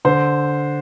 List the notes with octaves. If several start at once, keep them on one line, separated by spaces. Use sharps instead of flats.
D3 C5